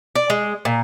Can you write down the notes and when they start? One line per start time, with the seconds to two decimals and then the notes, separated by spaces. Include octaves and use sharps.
0.15 D5
0.30 G#3
0.65 A#2